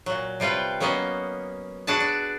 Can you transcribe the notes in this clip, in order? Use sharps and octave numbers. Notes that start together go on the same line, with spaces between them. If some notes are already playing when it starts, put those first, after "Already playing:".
A#2 F#3
C3 G3 F4 B4 G5
F#3 A#3 B3 C#4 D#5
D4 F#4 G#4 B4 A5
D5